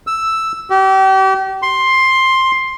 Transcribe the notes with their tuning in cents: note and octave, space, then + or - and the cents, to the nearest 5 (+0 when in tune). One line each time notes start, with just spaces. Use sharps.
E6 +0
G4 -35
C6 +10